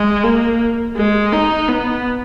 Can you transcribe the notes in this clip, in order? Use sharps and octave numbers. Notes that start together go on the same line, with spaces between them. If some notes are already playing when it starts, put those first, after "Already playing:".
Already playing: G#3
A#3
G#3
D#4
B3